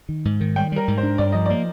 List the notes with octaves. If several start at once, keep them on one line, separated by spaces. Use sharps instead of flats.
D#3
G#2
D#3
G3 G5
G3 A#4
G#2
C5
D4
G2 D5
F3 D#5
A#3 D5